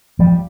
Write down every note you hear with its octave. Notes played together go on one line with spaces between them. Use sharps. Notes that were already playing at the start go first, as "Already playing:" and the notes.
F3 G3